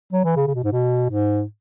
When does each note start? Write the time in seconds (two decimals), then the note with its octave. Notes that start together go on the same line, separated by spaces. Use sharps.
0.13 F#3
0.24 E3
0.36 C#3
0.47 C#3
0.55 B2
0.64 G#2
0.72 B2
1.10 G#2